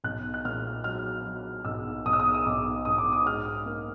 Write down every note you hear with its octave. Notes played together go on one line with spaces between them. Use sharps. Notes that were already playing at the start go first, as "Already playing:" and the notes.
B1 F#6
F#6
A#2 F6
F#3 F6
F#3
B1 E6
B1 D#6
E6
D#6
D#6
B1 D6
B1 D#6
D6
D#6
G#2 F6
A#3